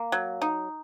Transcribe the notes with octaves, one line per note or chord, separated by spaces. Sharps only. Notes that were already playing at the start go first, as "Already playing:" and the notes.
Already playing: A#3
F#3
D#4